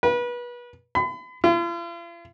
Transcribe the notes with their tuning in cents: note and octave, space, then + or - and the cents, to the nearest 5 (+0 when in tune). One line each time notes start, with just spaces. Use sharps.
B4 -30
B5 +40
F4 -45